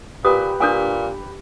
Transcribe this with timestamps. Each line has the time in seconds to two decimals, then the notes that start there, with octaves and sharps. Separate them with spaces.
0.25 A#2 G4 B4 D#6
0.60 A#2 D4 A4 G#5